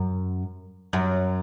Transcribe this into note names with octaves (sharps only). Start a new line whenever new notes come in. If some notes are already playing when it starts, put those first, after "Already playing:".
Already playing: F#2
F#2